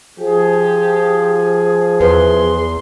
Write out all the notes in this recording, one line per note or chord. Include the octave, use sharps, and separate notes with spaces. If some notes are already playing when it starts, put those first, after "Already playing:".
F3 G4 G#4
E2 B4 C6